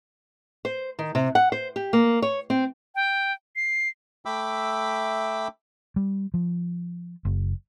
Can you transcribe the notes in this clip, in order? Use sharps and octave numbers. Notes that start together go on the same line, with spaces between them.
C5
D#3
C3
F#5
C5
G4
A#3
C#5
C4
G5
C7
A3 E5 G5 B5 D6 E6
G3
F3
F#1